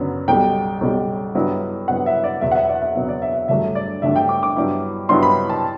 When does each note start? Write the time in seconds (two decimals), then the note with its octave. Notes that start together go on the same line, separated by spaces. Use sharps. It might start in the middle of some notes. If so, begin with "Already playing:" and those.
Already playing: F#2 D3 F#3 B3
0.28 B1 B2 G3 G5
0.81 B1 B2 G3
1.35 G2 F#3 B3 E4
1.88 G2 F#3 B3 E4 F#5
2.06 E5
2.24 D5
2.41 E2 B2 F#3 B3 E5
2.51 F#5
2.55 E5
2.69 D5
2.82 E5
2.95 E2 B2 F#3 B3 E5
3.09 D5
3.22 E5
3.35 E5
3.48 G1 G2 F#3 A3 D4 E5
3.75 D5
4.02 G1 G2 F#3 A3 D4 E5
4.16 G5
4.29 D6
4.43 D6
4.56 G2 F#3 B3 E4
5.09 G2 F#3 B3 E4 C6
5.23 B5
5.50 A5